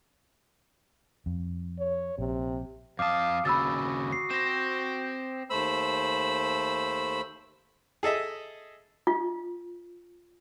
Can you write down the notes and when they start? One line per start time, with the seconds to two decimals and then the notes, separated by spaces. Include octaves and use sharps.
1.26 F2
1.79 C#5
2.19 A#1 C3
2.99 F2 F5 A5 D6 D#6
3.45 D#2 C#3 F#4 B5 E6 A6
4.12 C7
4.31 C4 C5 A#6 E7
5.50 D#2 A3 C5 B5 E6
8.03 G#4 A4 D#5 E5
9.07 F4